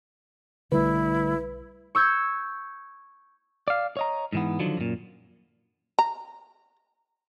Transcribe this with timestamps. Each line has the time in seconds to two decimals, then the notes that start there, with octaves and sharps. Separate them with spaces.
0.72 B1 D3 G3 A3 E4 B4
1.95 C#6 E6 G6 G#6
3.68 D5 F5
3.97 C#5 D#5 A#5
4.33 G#2 E3 B3
4.60 D3 D#3 F3 F#3
4.77 F#2 A#2
5.99 A#5